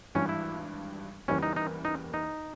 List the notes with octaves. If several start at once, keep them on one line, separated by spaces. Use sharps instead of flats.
G#1 G2 E3 G3 C#4
E4
E2 C#3 E3 G3 A#3 C#4
D#4
D#4
D#4
D#4